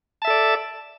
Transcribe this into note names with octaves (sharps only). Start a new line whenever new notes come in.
A4 D5 E5 A5